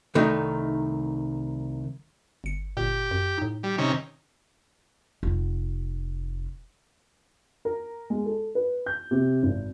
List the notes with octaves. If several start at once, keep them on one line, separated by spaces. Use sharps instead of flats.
C2 D#3 A3 D#4
G1 C#7
G1 A#2 G4
F#2
A2 D#4
G3
C3 D#3 C#4
F1 F4
A#4
G#3
A4
B4
G6
C3
G#1